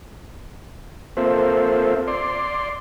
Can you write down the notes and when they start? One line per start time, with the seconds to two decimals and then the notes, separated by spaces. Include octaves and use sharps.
1.17 A#3 C4 F4 A4 C5 E5
2.08 D5 C6